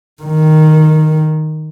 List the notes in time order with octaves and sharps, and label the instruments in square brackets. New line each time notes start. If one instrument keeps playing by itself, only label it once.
[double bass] D#3